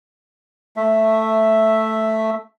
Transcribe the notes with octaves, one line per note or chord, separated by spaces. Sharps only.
A3 E5